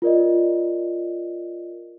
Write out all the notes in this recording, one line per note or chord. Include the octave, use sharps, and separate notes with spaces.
F4 A#4 D5 D#5